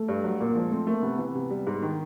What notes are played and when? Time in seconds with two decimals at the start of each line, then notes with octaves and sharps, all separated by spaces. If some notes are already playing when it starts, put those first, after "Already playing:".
Already playing: A3
0.08 G2
0.24 F#3
0.40 A#2 A#3
0.55 F3 G#3
0.71 A3 C4
0.87 A3 A#3
1.03 C3 B3
1.19 E3 B3
1.35 C3
1.50 G3
1.67 G#2
1.82 D#3